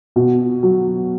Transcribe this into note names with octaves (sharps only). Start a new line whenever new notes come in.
B2
F#3